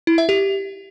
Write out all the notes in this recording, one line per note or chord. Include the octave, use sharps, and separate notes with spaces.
E4
E5
G4